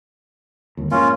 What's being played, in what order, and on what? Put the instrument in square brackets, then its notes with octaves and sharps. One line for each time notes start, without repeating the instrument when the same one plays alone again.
[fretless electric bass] G1 D#2
[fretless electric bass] F2 G#2 A#3 [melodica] C#4 F4